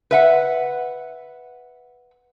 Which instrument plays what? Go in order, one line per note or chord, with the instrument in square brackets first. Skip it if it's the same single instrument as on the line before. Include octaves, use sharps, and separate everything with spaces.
[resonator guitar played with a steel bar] B4 E5 F#5